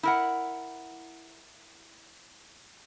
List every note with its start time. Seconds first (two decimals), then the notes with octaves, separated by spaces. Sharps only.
0.03 E4 A#4 F#5